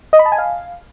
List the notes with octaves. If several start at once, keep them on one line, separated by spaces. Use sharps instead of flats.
D#5
B5
A5
G#5
F5